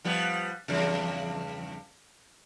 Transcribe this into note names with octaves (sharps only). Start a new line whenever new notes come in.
F3 G3 B3
E2 G2 C#3